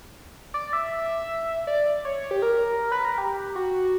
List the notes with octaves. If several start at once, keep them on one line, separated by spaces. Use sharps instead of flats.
D5
E5
D5
C#5
G4
A#4
B4
A#4
G4
F#4